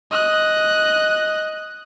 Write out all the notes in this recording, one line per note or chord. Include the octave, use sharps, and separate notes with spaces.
D#5 F#6